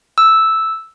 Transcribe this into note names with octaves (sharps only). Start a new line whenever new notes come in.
E6